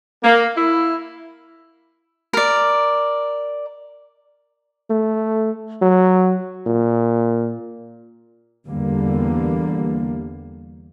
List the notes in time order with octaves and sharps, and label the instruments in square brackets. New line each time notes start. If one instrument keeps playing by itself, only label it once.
[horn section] A#3
E4
[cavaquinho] A#4 D5
[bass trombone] A3
F#3
A#2
[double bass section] E2 D3 G3 A#3